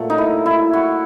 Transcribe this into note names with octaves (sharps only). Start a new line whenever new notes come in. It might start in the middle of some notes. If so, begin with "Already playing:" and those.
Already playing: A#2 F#3 A3
D#4
E4
E4
F#4